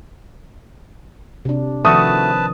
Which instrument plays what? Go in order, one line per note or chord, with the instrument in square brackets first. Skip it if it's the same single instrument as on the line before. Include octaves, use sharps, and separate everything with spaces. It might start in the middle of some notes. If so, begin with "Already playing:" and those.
[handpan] C3 D4
[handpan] D#3 F3 C4 [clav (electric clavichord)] A3 F#4 [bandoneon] B4 A5 [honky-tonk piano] D#6